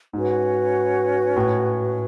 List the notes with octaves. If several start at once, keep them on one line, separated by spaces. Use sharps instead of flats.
G#2 C#4 F#4 B4
A2